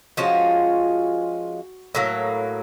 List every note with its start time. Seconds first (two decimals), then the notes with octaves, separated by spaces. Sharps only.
0.17 F3 G#3 C#4 F4 F#4
1.95 A2 F#3 A#3